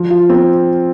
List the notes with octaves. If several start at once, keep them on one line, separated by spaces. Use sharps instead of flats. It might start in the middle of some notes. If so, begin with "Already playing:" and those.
Already playing: F3
F4
C4